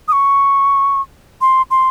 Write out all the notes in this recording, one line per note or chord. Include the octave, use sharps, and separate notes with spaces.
D#6
C#6
C6
C6